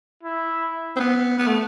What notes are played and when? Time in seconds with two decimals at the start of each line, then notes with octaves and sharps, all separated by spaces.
0.23 E4
0.96 C4
1.00 B3
1.38 B3
1.47 A3